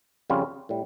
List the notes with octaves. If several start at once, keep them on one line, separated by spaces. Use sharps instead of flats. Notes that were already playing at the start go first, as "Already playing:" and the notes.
F2 C#3 G3 C#4 F4
A2 G3